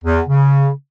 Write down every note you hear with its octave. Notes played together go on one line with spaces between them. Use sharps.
E2
C#3